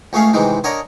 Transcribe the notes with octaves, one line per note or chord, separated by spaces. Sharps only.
C#2 A3 C#4 G#4 F5
C3 D#3 E3 G#3
D3 A#4 C#5 D#5 G#5